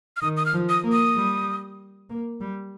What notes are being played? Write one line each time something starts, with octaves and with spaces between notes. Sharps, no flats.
F6
D#3 D#6
D#6
F6
F3
D#6
A#3
D#6
G3
A#3
G3